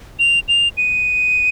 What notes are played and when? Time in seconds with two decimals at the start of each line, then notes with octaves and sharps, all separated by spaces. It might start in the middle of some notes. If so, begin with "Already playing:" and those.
0.19 F7
0.48 F7
0.77 D#7